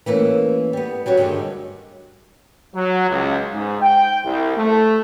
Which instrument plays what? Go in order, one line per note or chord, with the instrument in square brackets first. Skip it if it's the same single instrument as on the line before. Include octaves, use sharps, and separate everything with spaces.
[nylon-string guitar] E3 A3 A#3 C#4
G3 B3
F#3 G3 F#4 C#5
G2 D3 D#3 G#3
[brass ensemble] F#3
C#2
G#2
G5
C2
A3